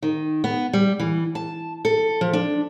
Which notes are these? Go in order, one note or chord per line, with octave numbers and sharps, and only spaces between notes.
D#3
B3
G3
E3
A5
A4
F3
D4